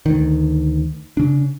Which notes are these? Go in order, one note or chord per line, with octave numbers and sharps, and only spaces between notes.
D2 D#3
C#3 D4